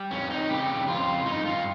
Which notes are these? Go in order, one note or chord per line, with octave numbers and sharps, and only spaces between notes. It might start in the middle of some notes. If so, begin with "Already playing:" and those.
Already playing: G3
F2 C#4
D#4
C#3 G4
F2 F4
G2 D#4
F4